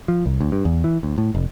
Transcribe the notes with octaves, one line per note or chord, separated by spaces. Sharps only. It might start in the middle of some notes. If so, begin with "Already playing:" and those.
F3
C2
D2
G2
E2
E3
D2
A2
F1